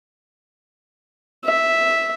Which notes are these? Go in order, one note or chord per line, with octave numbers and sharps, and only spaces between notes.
E5